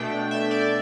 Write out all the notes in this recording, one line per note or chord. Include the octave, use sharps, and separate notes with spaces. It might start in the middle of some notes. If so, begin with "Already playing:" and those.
Already playing: B2 A3 D4 G5
E5
D5